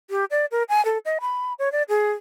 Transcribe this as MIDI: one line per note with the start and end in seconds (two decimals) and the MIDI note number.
0.10 0.25 67
0.31 0.45 74
0.51 0.63 70
0.69 0.84 80
0.85 0.98 69
1.05 1.18 75
1.21 1.53 83
1.59 1.71 73
1.72 1.83 74
1.89 2.12 68